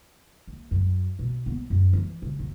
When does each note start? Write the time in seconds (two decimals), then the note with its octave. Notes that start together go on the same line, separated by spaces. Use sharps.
0.48 D#2
0.71 F#2
1.19 B2
1.46 B3
1.70 F#2
1.93 E3
2.22 C#3
2.39 F#2